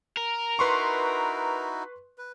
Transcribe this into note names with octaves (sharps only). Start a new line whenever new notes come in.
A#4
D#4 E4 F#4 B4 C6 C#6
B4